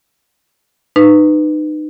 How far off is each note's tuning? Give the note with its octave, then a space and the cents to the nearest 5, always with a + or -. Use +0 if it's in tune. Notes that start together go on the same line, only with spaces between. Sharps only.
D#4 -30 B4 +10